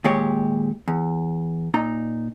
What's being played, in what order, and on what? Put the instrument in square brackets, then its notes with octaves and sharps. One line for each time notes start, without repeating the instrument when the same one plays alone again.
[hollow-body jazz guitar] D#2 A#2 G#3 G4 C#5
E2
A#2 D#4 A#5